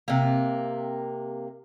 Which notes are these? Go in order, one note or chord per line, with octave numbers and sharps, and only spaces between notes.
C3 A#3